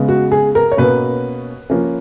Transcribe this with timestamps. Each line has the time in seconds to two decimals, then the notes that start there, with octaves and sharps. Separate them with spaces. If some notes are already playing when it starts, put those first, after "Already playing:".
Already playing: C#3 G#3 B3
0.09 F#4
0.32 G#4
0.55 A#4
0.72 C#5
0.77 B2 A#3 C#4 B4
1.70 F3 A#3 C#4